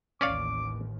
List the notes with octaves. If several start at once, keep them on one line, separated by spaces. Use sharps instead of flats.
A1 D#2 C#4 D5 F5 D6